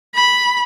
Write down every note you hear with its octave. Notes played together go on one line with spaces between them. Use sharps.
B5